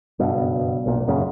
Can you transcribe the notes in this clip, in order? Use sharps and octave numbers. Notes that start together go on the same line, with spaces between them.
F#1 G2 B2
B1 A#2
F#2 A#2 C#3